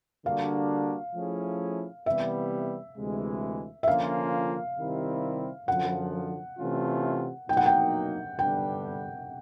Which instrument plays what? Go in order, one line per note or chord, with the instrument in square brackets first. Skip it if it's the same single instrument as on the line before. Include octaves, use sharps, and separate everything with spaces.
[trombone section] D3 G3 A#3 D4 F#4 [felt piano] F5
[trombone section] F3 A3 C#4 E4 G#4
[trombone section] C3 E3 G3 B3 [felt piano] E5
[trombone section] D2 C3 E3 G#3
[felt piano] E5
[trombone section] D3 F3 A#3 C#4 F4 [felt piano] F5
[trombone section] C3 D#3 G3 C4 E4
[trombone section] F#2 D3 F3 [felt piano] F#5
[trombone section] C3 E3 A3 C#4 F4
[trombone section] B2 F#3 A#3 D#4 [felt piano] G5
[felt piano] F#5
G5
[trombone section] G2 D3 G3 B3 D4 [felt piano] G5